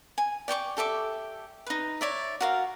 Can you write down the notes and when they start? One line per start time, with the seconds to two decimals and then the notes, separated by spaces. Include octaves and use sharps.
0.18 G#5
0.48 D5 G5 C#6 D6
0.77 G4 A4 E5 D6
1.67 D#4 B4
2.01 C#5 D5 E5
2.41 F#4 A#4 F5